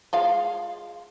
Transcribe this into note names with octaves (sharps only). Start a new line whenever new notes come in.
G#3 F4 F5